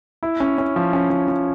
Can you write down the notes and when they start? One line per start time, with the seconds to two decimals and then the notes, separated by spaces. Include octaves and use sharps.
0.23 E4
0.40 C#4
0.58 C#4
0.76 F3
0.93 C#4
1.10 F3
1.28 F3